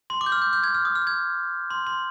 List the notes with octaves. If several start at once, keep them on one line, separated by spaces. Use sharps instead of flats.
C6
D6
G6
F6
G6
G6
G#6
F6
D#6
F6
G#6
C6
C6